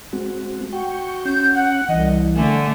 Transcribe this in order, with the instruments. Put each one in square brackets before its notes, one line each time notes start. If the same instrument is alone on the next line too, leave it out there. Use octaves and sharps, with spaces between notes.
[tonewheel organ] G#3 C4 F#4
[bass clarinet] F#4 [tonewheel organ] G5 C#6
[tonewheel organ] C#4 [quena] G6
[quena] F#5
[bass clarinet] C2 [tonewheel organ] E3 [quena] D#5
[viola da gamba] D3 A3 [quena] G#5